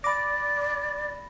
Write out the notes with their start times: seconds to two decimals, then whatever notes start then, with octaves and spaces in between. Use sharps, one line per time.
0.04 D5 B5 D6 A#6